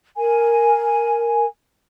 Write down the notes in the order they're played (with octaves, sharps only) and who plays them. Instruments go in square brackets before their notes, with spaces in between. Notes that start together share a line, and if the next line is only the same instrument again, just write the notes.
[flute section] A#4 G#5